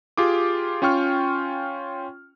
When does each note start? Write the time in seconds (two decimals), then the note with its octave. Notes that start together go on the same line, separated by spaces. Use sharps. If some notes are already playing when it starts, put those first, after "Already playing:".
0.17 F4 G4 G#4 D6
0.82 C#4 F4 G5 C#6 F6